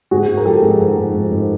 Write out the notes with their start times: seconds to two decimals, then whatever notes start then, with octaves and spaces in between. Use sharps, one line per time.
0.11 G#2 F#4 G#4
0.28 G#2
0.37 A#4
0.45 F3 G4 A4
0.62 G#2 G#4 A#4
0.80 F3
0.98 G#2
1.14 G#2
1.32 G#2